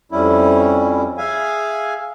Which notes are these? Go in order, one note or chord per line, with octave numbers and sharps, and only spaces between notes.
F2 G3 C#4 E4
G#4 E5 F5 G#5